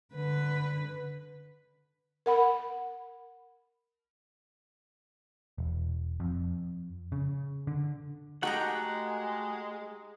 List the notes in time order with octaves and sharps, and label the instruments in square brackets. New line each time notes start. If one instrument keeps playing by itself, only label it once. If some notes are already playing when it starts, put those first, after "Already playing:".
[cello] D3 B4
[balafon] A#4 F#5 B5
[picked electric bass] E1
F2
C#3
D3
[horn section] G#3 [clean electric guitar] A3 F#4 F#5 [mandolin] D#4 G4 A#5